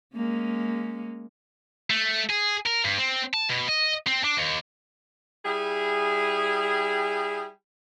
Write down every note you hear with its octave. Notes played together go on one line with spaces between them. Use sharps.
G#3 A#3 C#4
A3
G#4
A#4
G2
C4
A5
B2
D#5
C4
D4
D#2
G3 E4 G#4